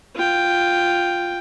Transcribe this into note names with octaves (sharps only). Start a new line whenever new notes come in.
F4 G5